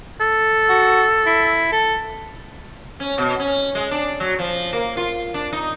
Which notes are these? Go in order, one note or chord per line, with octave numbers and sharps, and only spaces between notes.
A4
F#4
E4
A4
C#4
B2
C#4
G#3
D4
F#3
F3
A#3
F4
D4
D#4